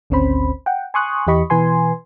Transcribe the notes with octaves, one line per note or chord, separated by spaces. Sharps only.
G#1 D2 C4 C#4 C5 B5
F#5 G5
G#5 C6 C#6 D#6 F#6
E2 E3 G4 D#5 B5 C#6
B2 E3 B4 G#5 C6